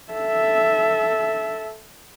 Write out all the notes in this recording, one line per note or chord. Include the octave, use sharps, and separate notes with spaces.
A4 E5